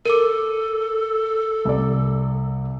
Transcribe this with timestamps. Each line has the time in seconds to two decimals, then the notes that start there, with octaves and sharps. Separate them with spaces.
0.06 A4 A#4 D6
1.65 C2 D5